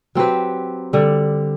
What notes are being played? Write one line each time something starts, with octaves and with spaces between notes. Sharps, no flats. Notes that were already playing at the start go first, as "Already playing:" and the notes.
F#3 C4 G4 B4
D3 G3 D4